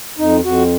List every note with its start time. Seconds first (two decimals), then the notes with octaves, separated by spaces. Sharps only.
0.18 F2 D#4
0.45 F2 F#4